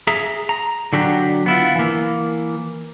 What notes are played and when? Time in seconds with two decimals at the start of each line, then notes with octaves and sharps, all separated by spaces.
0.07 G#4 E5 A#5
0.49 A#5
0.93 D3 F#3 D4 F#4 G4
1.46 B3 E4 F4
1.75 E3 A#3